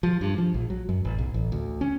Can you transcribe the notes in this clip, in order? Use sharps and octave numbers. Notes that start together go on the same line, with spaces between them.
F3
G2
F3
A#1
F#3
F#2
A1
B1
A1
D2
C#4